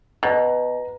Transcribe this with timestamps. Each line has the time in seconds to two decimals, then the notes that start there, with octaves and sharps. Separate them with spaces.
0.23 B2 B4 A#5